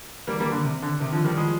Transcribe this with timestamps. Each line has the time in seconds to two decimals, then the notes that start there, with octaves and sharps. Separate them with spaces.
0.27 G3 A#3
0.40 G3 A#3
0.51 D3
0.64 C3
0.82 D3
1.00 C3 D#3
1.12 D3 F3
1.24 D#3 G3
1.37 F3 G#3